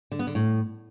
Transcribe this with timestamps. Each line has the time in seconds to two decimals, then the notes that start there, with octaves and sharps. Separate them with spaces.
0.12 D3
0.19 B3
0.27 D3
0.35 A2